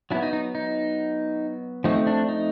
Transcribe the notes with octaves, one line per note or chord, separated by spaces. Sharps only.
F#3 B3 D4 E4
D#4
D#4
D#4
F3 A3 C4 D#4
D4
D#4